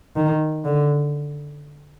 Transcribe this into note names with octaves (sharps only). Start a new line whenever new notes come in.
D#3
D3